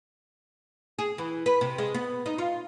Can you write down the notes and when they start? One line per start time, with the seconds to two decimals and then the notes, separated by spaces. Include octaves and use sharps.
0.99 G#4
1.18 E3
1.46 B4
1.61 C3
1.78 G#3
1.94 B3
2.26 D#4
2.38 F4